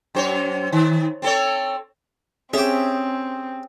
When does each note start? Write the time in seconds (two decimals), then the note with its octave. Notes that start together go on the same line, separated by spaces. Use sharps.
0.15 F#2 C5 C#5
0.72 D#3
1.22 C4 A4 C#5
2.53 C4 C#4 G4 G#4 E5